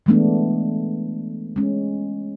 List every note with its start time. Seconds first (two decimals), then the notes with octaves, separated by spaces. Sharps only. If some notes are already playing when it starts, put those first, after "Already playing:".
0.06 E3 G#3 A3 B3 D4
1.56 G#3 C#4